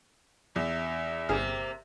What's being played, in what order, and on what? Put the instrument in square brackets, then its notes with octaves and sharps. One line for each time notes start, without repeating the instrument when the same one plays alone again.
[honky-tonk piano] E2 [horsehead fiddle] E5
[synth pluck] G1 G#4 F6 [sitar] C3 A#3